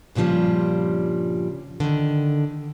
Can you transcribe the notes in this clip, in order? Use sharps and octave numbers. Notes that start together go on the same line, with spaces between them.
G2 A#2 C#3 F3 G3
D3 D#3